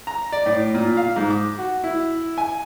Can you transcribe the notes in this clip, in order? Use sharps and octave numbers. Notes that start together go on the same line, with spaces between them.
A#5
D5
A2
A#2
F5
G#2
D6
F#4
E4
G#5